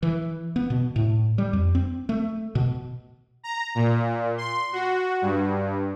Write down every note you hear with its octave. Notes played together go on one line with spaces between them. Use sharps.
E3
B3
B2
A2
G3
F2
C4
A3
B2
A#5
A#2
C6
F#4
G2